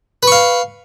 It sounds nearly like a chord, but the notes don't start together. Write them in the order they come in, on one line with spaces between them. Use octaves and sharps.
B4 C#6 F5